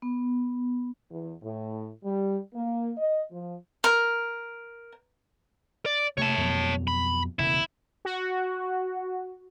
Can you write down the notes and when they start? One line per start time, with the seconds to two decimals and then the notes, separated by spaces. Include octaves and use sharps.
0.02 B3
1.11 E2
1.43 A2
2.04 G3
2.54 A#3
2.98 D#5
3.32 F3
3.84 A#4
5.86 D5
6.18 C3 A3 C#5 A5
6.38 F2 B2 F#3
6.88 B5
7.39 E1 C#3 E4
8.05 F#4